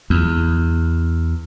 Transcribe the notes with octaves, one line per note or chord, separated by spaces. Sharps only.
E2